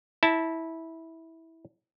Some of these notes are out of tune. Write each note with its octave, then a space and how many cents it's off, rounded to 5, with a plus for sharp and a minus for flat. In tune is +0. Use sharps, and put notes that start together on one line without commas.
E4 -15 A5 +5